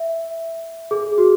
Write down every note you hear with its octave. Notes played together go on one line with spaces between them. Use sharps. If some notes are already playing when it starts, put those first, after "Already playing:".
Already playing: E5
G#4
F#4